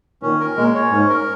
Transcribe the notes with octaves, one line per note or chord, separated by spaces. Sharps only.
A#2 D#3 C#4
A#4
A#2 G#3
C#5
G#2 C#4
A#4